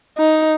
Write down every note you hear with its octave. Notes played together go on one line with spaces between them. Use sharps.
D#4